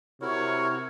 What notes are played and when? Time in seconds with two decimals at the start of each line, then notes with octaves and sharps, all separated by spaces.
0.21 C3 E4 F#4 A#4 C#5